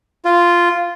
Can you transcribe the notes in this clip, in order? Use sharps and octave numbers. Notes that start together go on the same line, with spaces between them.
F4